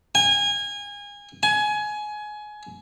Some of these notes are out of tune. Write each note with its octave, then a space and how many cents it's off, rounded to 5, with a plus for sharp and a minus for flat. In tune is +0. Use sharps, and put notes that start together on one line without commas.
G#5 -30
G#5 +20